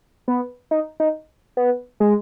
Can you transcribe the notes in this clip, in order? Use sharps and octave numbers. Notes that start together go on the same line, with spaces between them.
B3
D#4
D#4
B3
G#3